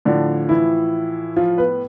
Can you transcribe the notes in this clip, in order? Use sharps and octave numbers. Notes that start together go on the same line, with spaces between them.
A2 D3 F3 D4
E3 E4
F3 F4
B3 B4